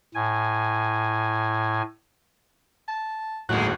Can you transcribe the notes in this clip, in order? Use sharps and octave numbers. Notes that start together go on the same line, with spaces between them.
A2 G#5
A5
G1 D#2 A2 F#3 G#3 F#4 F#6